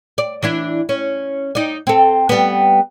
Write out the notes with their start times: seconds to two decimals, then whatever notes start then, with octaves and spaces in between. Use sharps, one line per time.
0.18 D5
0.43 E3 D4 E4
0.89 C#4
1.55 D#4 D5
1.87 C4 A4
2.29 G3 B3